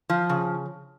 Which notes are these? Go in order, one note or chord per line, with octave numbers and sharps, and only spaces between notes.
F3
C#3